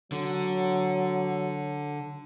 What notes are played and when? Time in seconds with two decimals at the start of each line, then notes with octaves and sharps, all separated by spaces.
0.12 D3 F#3